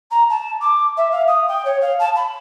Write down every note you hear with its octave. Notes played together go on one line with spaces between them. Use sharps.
A#5
A5
D6
E5
F5
D#6
G5
C#5
F5
A5
B5